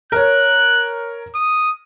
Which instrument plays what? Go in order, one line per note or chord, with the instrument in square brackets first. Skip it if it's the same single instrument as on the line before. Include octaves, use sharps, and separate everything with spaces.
[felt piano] A#4 C#5 [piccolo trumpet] F#6
[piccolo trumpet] D#6